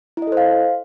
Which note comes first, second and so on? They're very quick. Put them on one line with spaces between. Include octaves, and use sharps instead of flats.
E4 D#5 A4 C5 F5